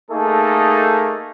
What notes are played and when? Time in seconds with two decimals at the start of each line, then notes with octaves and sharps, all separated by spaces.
0.10 A3 A#3 D#4 G#4 A4